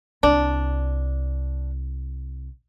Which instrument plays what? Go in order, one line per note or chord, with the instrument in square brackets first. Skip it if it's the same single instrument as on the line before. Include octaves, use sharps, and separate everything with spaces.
[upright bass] C2 [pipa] D4